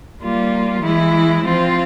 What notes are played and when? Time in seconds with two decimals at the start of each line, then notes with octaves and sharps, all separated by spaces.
0.22 G3 A#3 F4
0.82 E3 G#3 E4
1.43 F3 C4 F4